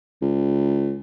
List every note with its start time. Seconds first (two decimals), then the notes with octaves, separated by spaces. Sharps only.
0.22 C#2